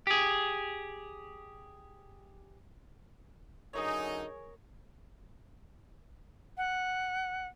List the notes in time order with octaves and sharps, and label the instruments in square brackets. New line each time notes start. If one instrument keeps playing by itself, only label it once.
[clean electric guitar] G4 G#4
[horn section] F#2 D3 D#4 [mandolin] G#4 A#4 C#5
[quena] F#5